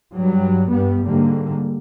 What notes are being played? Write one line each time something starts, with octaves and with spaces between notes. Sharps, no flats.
G2 F#3 G3
G2 G3 B3
G#2 D3 G3 A#3